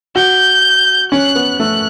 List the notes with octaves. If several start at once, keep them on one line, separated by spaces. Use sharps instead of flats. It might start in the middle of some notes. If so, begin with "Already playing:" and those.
F#4 G6
C#4 F#6
B3
A3 F#6